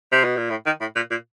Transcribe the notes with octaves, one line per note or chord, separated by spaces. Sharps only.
C3
B2
A#2
A2
D#3
A2
A#2
A#2